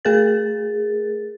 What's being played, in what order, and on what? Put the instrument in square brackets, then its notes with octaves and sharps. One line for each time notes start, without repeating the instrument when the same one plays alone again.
[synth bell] A3 G#4 A#4 A6